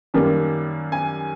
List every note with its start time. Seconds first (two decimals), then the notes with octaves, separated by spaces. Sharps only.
0.14 F#2 D#3 G3 A#3
0.92 G#5